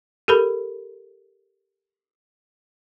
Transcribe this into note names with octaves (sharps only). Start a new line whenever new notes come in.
G4 A4 A#4 B5